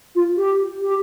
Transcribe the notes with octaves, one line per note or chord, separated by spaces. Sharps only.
F4
G4
G4